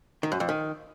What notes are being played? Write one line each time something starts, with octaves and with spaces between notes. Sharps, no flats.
D#3
F#2
F2
D#3